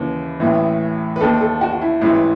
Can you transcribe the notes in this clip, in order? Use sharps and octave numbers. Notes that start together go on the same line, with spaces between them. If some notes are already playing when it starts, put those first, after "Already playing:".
Already playing: D#2 C#3 E3 B4
A1 A2 E3
B4
D#2 D#3 A4
A4
F#4
F#4
E4
A1 G#2 E3 E4